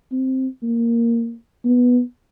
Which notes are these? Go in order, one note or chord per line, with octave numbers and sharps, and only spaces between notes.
C4
A#3
B3